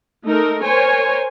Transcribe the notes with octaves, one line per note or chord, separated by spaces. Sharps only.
A3 D#4 A#4
A#4 C5 C#5 G#5